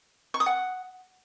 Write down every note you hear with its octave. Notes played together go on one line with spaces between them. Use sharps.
C#6
D#6
F#5